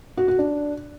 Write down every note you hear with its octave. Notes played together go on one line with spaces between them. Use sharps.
F#4
F#4
D4